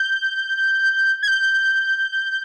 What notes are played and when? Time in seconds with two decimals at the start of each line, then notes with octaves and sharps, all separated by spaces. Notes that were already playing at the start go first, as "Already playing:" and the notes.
Already playing: G6
1.23 G#6
1.28 G6